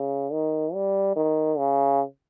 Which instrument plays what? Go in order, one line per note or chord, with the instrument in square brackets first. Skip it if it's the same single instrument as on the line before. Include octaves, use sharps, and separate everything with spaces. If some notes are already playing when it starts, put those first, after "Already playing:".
Already playing: [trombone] C#3
D#3
G3
D#3
C#3